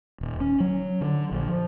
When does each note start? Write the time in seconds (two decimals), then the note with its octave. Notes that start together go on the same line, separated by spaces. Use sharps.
0.21 D#1
0.40 C#4
0.60 F#3
1.01 D3
1.31 A#1
1.48 F3